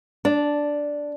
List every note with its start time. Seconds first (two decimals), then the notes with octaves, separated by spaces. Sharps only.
0.25 D4